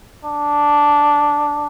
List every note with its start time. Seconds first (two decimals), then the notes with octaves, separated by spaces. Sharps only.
0.25 D4